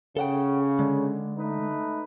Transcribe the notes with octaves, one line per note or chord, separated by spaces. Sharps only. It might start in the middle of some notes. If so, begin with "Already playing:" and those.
C#3 A4 F#5 G5
D3 G#3
A3 D#4 B4